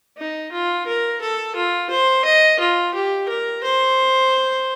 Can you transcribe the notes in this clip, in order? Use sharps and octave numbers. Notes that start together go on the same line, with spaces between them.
D#4
F4
A#4
A4
F4
C5
D#5
F4
G4
A#4
C5